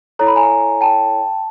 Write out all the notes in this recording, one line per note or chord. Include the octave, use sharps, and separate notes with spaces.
E4 A4 C#5 A#5
B5
G#5 A#5
G5 A5